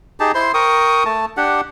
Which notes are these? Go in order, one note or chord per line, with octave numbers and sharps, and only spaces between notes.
D#4 G4 G#4 A5
E4 C5 C6
A#4 G5 C#6 D#6
A3 A5
D4 G4 F#5